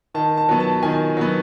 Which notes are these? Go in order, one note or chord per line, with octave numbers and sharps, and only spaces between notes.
D#3 A5
A5
F#3 B3
A5
D#3 G#5
F#3 B3